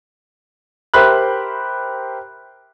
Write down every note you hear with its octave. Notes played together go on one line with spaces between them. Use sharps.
G4 A#4 C5 E5 B5 F#6